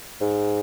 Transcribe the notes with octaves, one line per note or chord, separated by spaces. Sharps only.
G#2